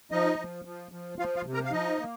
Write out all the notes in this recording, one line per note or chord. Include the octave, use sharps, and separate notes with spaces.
F3 D#4 D#5
F3
F3
F3
F3 F4 F5
F4 F5
C3
A#4 A#5
F5
F3 D#4 D#5
A#3